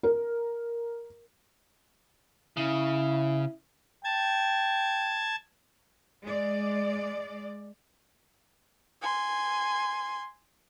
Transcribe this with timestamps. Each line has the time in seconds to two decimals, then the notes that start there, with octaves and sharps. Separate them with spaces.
0.03 A#4
2.57 C#3 E4
4.04 G5 A5 G#6
6.23 G#3 D5
9.02 G#5 C6